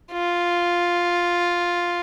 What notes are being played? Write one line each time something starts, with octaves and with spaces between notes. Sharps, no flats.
F4